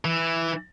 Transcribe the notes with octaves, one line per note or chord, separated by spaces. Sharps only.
E3